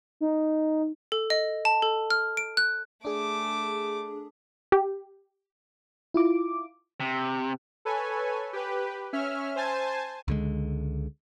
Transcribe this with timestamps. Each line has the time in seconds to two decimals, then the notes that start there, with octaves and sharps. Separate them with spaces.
0.21 D#4
1.12 A4
1.30 D#5
1.65 A5
1.82 A4
2.10 F6
2.37 D7
2.57 F#6
3.05 A3 D4 G#4 D6
4.72 G4
6.14 E4 F4 D6
7.00 C3
7.85 A4 B4 C#5 G#5
8.53 G4 B4
9.13 C#4 E5 F6
9.56 C5 G#5 A5
10.28 C#2 D3 G#3